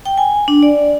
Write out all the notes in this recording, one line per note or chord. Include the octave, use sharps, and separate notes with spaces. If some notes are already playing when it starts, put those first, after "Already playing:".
G5
G#5
D4
D5